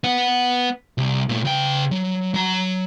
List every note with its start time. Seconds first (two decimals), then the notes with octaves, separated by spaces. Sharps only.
0.04 B3 F#5
0.98 C2
1.29 A#2 A3
1.45 C#3 G5
1.91 F#3
2.34 F#3 A#5